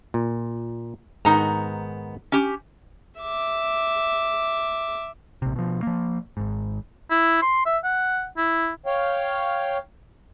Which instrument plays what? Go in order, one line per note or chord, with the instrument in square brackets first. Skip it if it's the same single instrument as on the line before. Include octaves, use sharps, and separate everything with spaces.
[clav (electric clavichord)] A#2
[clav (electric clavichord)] G#2 D#3 [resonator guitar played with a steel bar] B3 D#4 A#5
[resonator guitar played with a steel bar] C#4 G4
[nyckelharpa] E5 D6
[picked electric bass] A#1 C3
B2 F3
F3 A#3
G#1 G#2
[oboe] E4
C6
E5
F#5
E4
[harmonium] C#5 F5 G5